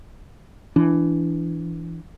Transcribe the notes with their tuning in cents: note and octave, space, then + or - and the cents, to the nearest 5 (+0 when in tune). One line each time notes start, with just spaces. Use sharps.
E3 +10 D4 -15